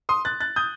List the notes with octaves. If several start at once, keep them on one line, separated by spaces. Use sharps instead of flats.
C6 D#6
F#6 A6
F#6 A6
D#6 G6